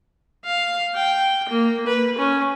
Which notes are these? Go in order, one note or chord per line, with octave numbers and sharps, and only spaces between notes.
F5
G5
A#3
B4
C#4